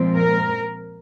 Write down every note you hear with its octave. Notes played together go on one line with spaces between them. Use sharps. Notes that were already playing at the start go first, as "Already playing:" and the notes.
Already playing: A#2 F3 G#3 C4
A#4